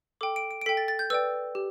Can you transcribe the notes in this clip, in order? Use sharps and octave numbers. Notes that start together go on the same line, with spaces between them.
A4 G5 D6
D7
D7
D7
A4 G5 B6
A6
A6
G6
B4 D5 G5 E6
G4